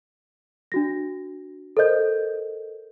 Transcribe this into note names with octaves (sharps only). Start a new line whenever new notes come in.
D4 F#4 A#6
A4 A#4 C5 D#5 G6